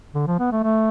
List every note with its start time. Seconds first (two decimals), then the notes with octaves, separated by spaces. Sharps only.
0.15 D3
0.27 F3
0.39 B3
0.52 A3
0.63 A3